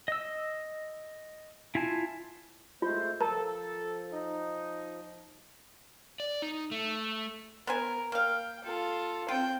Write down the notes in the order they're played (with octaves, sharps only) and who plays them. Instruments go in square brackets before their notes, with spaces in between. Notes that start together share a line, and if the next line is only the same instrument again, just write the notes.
[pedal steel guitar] D#5 E6
E4 F4 G#5 A5
[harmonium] G#3 A3 C5 [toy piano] F4
[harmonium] F3 [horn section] A4 [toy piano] A#4 A5 [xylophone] A#5
[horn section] D#4
[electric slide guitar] D5
D#4
A3
[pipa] B3 C5 G#5 [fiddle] A#4
[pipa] A#3 F5 [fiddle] G5
[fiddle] F4 A4
[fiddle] C4 G5 [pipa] F4